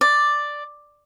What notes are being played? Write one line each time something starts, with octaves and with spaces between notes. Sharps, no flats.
D5